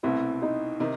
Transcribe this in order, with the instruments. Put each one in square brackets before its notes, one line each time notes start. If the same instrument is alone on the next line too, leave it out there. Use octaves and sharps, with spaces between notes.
[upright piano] C2 B2 A3 [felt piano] C4 E4
[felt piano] D#4
[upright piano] C3 D#3 [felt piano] D#4